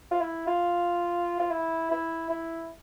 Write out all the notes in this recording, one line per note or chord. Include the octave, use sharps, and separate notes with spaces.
F4
E4
F4
F4
E4
E4
E4